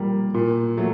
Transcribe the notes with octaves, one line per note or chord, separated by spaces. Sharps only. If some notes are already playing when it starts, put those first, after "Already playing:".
Already playing: A#2 G3 A#3
A#2
F#3 A3